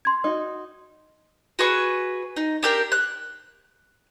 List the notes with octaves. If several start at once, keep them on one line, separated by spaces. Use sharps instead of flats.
C6 G#6
D#4 F#4
F#4 G#4 B4 C#6
D#4
D4 G4 A#4
F#6